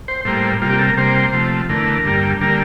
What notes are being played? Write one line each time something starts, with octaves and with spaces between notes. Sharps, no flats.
C5
A2 G3 A#3 C5
C3 G3 A#3 F4
G4
A4
A#4
C3 G3 A#3 C5
C3 F3 A3
E2 D3 A3 A#4
G2 D3 G3 A#3
D3 G3 A#3 A#4